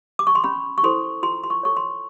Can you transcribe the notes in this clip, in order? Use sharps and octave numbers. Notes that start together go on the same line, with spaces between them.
D6
C#6
C6
C#4 B5
C#6
E4 A4 C5 C6
F4 C6
C6
C#6
A4 C#5 C#6
C6